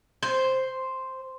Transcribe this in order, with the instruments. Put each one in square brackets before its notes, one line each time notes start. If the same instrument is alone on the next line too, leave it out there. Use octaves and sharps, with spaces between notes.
[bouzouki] C5